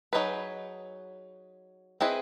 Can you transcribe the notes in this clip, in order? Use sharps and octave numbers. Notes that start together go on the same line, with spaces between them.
F#3 B3 D#4 G#4 B4
C4 E4 G#4 B4 D#5